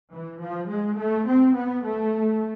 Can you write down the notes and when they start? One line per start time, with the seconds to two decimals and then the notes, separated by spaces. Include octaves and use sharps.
0.11 E3
0.40 F3
0.68 G#3
0.97 A3
1.26 C4
1.55 B3
1.83 A3